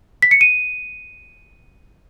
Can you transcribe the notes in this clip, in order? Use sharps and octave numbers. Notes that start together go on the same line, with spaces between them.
B6
C#7
D#7